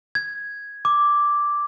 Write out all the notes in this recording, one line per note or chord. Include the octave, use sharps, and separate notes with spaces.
G#6
D6